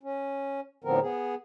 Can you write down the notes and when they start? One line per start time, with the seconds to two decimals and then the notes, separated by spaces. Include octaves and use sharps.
0.03 C#4
0.84 A2 D3 F3 B3 C4 A#4
1.02 B3 G#4